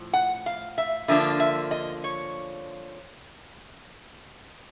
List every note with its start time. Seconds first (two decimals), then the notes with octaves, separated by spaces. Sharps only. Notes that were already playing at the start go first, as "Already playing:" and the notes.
Already playing: A2 F3
0.13 F#5
0.46 F5
0.78 E5
1.08 D3 F3 A#3 D4 E5
1.40 E5
1.71 D#5
2.04 C#5